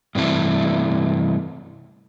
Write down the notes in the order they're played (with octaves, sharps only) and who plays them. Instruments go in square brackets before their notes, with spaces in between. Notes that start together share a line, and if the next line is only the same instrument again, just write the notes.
[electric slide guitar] G2 C3 E3 A3